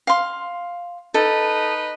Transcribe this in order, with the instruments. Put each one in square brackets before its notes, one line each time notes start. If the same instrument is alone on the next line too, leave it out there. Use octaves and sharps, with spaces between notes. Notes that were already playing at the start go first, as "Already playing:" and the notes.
[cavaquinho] F5 C6
[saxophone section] D#4 B4 D#5 [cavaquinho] A4